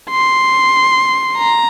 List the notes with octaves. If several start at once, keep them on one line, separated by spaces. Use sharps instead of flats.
C6
A#5